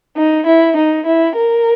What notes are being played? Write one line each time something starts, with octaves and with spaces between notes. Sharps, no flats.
D#4
E4
D#4
E4
A#4